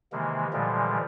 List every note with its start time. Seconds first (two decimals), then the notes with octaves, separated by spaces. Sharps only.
0.12 C3 D#3 E3 G#3 A#3
0.53 A#2 D3 E3 F3 G3 G#3